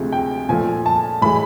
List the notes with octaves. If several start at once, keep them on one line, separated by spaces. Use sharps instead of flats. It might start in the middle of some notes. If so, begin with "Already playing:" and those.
Already playing: D2 C3 F3 G#3
G5
A#2 F3 A3 G#5
A5
A2 E3 G#3 B5